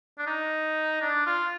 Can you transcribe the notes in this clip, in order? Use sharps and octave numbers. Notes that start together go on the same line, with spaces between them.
D4
D#4
D4
F4